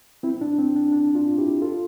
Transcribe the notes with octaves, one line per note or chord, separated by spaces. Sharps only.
C4 E4
D4
C4
D4
D4
D4 F4
E4 G4
F4 A4